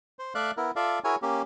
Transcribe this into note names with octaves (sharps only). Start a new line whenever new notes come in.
C5
A3 D5 E5 F5 F#6
B3 E4 A#4
F4 A4 D5 E5 F5
E4 F#4 G#4 A#4 C#5 G#5
A#3 C#4 G4